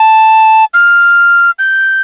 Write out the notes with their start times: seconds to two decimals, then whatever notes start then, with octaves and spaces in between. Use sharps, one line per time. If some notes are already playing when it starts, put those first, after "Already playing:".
Already playing: A5
0.74 F6
1.59 G6